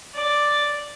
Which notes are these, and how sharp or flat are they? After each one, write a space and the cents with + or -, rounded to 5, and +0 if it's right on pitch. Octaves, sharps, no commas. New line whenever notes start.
D5 +0